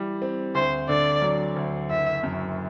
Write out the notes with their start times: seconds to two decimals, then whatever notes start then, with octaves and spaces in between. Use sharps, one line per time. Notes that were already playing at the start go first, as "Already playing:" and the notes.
Already playing: E3 G3
0.22 C4
0.55 D2 C5
0.89 D3 D5
1.22 F#3
1.56 D2
1.90 F#1 E5
2.23 F#2